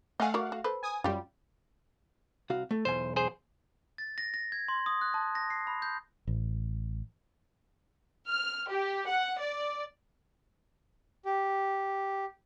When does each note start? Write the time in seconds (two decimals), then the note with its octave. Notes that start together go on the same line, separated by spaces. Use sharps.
0.20 A3 D#5 F5 F#5 G#5
0.34 F#4 A#4 D5
0.52 F#4
0.64 A4 B4 C5
0.83 G#5 D#6
1.04 F#2 G3 F4 G4
2.50 C2 F#4 F5
2.71 A3
2.85 B1 E2 C5 G#5
3.16 G#4 C5
3.98 A6
4.18 A#6
4.34 A#6
4.52 G#6
4.68 C6
4.86 D#6
5.01 F#6
5.14 A5
5.35 A#6
5.50 C7
5.67 B5
5.82 G6
6.27 A1
8.28 F6
8.70 G4
9.08 F#5
9.40 D5
11.25 G4